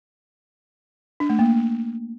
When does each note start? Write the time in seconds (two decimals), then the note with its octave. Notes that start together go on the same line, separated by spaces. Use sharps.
1.20 D4
1.30 A3
1.39 A#3